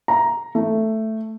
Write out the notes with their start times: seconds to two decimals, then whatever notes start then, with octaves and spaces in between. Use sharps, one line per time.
0.08 A#5
0.55 A3